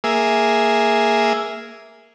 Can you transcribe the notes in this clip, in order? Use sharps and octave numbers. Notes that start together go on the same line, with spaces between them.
A#3 G#4 E5